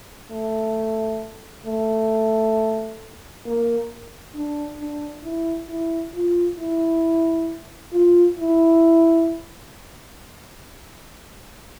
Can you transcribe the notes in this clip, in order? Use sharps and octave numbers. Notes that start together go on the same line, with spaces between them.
A3
A3
A#3
D4
D4
E4
E4
F4
E4
F4
E4